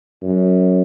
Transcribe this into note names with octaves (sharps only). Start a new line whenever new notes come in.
F#2